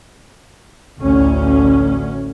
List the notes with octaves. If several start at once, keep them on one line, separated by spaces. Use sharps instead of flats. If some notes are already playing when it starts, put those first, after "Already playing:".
A1 D2 C#4